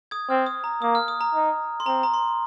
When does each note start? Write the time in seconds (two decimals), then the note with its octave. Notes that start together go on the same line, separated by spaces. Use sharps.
0.11 D#6 G#6
0.29 C4 F6
0.47 D#6
0.64 A#5
0.82 A#3 D#6
0.95 F6
1.08 D#6
1.21 A#5
1.34 D#4
1.80 C6
1.86 C4 A#5
2.03 A#5
2.14 C6